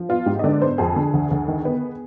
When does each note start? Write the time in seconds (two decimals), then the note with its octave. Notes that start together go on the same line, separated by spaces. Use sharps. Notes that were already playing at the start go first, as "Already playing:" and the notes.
Already playing: F3
0.09 B3 F4
0.26 G#2 G4
0.39 D#5
0.44 D3 D5
0.61 B3 C5
0.78 F2 G#4
0.96 D3
1.14 D2
1.31 D2
1.48 D#3
1.65 B3